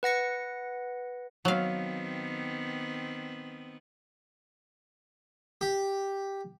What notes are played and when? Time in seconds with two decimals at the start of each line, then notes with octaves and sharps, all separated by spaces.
0.03 B4 F#5 A#6 C#7
1.45 D#3 F#3 B3 C4 F5
5.61 G4